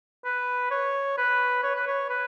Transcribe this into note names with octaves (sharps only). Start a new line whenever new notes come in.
B4
C#5
B4
C#5
B4
C#5
B4